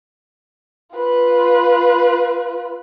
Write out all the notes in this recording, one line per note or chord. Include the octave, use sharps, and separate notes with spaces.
F4 B4